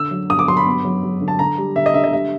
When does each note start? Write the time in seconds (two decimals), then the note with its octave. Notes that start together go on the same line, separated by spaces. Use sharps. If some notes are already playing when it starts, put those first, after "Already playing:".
Already playing: D3 E6
0.11 F#3
0.29 G2 D#6
0.39 D6
0.48 F#3 C6
0.57 B5
0.65 B3
0.85 F#3
1.03 F#3
1.21 D3
1.28 A5
1.39 D3 A#5
1.58 G3
1.76 D3 E5
1.86 D#5
1.94 D3 E5
2.04 D#5
2.12 G3 E5